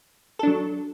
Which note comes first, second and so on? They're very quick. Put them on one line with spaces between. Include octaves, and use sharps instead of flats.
A4 D4 F#3